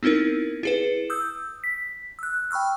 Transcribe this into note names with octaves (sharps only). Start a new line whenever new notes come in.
B3 C4 D#4 E4 A#4
E4 G#4 B4
D#6 E6 G6
B6
E6 F#6
G5 B5 C#6 E6 F6